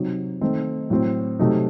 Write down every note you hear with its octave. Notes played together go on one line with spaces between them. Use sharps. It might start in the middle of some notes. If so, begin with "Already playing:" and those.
Already playing: C3 F#3 C4 D#4
D#3 A3 C4
A2 F#3 C4
C3 F#3 A3 D#4